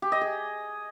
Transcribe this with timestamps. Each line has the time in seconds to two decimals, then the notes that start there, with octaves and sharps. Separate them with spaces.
0.02 G4
0.12 D#5
0.21 G#4